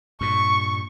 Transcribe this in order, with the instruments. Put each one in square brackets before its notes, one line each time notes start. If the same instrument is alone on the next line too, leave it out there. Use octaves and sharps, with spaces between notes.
[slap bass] G2 A#2 [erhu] C#6